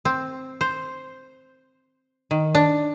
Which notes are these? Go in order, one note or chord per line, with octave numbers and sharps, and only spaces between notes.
C4
C5
D#3
D4